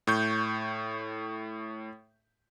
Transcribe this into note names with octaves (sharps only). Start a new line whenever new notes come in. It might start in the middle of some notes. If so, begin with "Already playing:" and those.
A2 C#6 G6